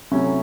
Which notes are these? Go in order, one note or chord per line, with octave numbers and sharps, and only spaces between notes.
C3 F#3 A3 C#4 E4